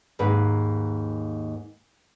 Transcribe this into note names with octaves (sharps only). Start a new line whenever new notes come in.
D#2 G#2 A#3 B4